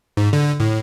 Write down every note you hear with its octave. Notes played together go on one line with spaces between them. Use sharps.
G#2
D3
A2